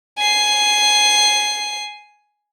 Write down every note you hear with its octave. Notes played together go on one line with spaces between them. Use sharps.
G#5 C7